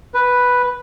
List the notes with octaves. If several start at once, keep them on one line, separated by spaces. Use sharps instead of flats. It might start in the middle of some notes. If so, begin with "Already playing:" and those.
B4